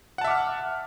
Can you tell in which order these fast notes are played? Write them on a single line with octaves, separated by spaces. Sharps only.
F#5 A5 E5 D6 F6